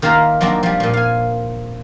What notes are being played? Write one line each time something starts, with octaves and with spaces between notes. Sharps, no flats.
D#3 A#3 F4 C5 E5 A#5
F3 F#3 A#3 C4 D4
F3 G3
A#2 F3
F5 G#5